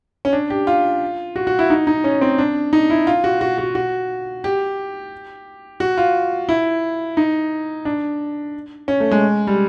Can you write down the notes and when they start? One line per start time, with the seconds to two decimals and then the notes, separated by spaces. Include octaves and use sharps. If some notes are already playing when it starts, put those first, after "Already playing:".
0.25 C#4
0.33 D4
0.50 G4
0.67 F4
1.36 F#4
1.47 F#4
1.59 E4
1.70 D#4
1.87 D#4
2.04 C#4
2.21 C4
2.38 D4
2.73 D#4
2.90 E4
3.07 F4
3.24 F#4
3.41 F#4
3.58 F#4
3.75 F#4
4.44 G4
5.80 F#4
5.97 F4
6.49 E4
7.17 D#4
7.85 D4
8.88 C#4
9.00 A3
9.11 G#3
9.47 G3